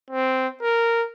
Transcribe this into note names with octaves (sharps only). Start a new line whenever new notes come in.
C4
A#4